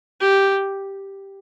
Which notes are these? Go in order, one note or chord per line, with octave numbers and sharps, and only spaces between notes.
G4